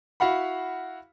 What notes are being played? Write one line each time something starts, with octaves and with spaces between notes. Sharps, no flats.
E4 F#4 F5 F#5 B5